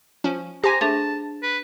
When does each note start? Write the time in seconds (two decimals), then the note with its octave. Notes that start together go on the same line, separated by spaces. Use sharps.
0.24 F3 C#4
0.64 G4 C5 G#5 A#5 C6 A#6
0.81 A3 D4 G#4 A5 A6
1.43 B4